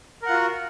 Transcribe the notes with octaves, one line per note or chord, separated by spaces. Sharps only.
F4 F#4 A#4 F#5